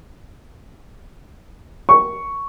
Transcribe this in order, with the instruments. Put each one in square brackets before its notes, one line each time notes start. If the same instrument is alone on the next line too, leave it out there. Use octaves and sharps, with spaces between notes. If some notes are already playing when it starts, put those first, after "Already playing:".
[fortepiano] C#6